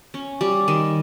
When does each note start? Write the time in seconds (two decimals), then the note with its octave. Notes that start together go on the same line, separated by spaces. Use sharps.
0.14 C#4
0.41 G3
0.68 D#3